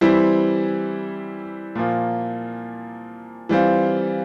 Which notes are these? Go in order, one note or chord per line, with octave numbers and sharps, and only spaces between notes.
E3 G3 C4 E4
A#2 F3 A#3
E3 G3 C4 F4